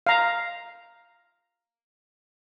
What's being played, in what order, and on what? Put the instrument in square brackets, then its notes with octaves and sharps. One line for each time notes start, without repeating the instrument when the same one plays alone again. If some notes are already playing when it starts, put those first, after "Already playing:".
[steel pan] F5 A#5